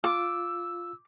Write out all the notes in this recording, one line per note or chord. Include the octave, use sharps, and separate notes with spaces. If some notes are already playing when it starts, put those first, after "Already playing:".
F4 D6 E6